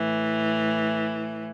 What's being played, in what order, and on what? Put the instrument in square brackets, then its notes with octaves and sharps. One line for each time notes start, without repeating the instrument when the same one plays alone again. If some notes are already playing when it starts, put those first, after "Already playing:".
Already playing: [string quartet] A2 E3